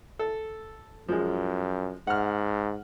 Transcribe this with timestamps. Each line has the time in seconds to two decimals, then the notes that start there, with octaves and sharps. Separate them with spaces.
0.19 A4
1.08 F#2 F3 G#3
2.07 G#2 F#5 F6